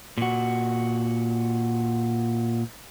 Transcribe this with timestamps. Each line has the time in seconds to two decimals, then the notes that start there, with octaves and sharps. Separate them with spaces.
0.17 A#2 F#4